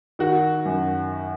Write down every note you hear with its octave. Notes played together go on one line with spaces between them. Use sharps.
D#3 F#4
F#2